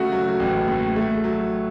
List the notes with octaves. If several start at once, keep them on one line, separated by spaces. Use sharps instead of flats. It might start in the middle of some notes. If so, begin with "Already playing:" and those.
Already playing: C#3 A3 F#4
F#3
A1
A2
A3
F#3